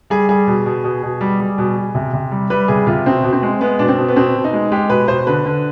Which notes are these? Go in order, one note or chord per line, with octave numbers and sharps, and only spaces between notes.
G3 G#4
G3 G#4
B2
B2
B2
B2
G3
G3
B2
B2
C3
C3
G3
G3 B4
C3 G#4
C3 F4
B2 C4
B2
C4
G#3
G#3 B3
B2 D4
C4
B2
B3
B2 C4
B2
D#4
G#3
G#3 G4
B2 B4
B2 C5
D3 B4
D3